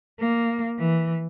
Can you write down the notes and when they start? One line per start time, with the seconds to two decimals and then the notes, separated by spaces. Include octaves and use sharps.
0.19 A#3
0.79 E3